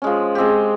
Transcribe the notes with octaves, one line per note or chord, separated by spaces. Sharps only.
F3 G#3 C#4
G#3 C4 G4